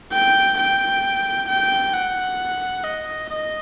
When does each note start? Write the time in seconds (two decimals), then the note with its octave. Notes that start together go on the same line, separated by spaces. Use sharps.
0.13 G5
0.58 G5
1.48 G5
1.93 F#5
2.84 D#5
3.30 D#5